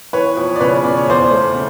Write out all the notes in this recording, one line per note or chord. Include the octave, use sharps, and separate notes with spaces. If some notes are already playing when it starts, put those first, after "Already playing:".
E3 B4 C#5
F2
D5
C#3 B4 C#5
C#3 D5
C#5
E2 C5 D5
A3
C#3